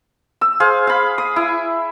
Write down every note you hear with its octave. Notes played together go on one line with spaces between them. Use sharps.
E6
G#4 C5 F5
F5 B5
D#6
E4